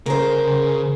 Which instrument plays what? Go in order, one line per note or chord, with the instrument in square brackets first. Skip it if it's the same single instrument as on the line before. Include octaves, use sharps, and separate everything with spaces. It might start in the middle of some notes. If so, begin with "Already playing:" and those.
[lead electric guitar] C#3 [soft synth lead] G#4 [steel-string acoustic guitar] A#4 C5